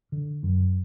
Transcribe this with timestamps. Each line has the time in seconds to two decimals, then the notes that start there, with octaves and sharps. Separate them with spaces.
0.12 D3
0.43 F#2